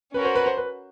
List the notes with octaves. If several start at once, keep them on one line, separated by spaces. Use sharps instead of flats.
C#4 F#4 A#4 B4
C5
B4
C5
B4